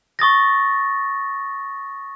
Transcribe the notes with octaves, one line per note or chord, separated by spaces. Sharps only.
C#6 D#6 A6 A#6